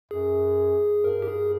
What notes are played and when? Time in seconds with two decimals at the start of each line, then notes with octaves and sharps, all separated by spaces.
0.11 F#2 G#4
1.04 G2 A#4
1.22 G4
1.28 G#4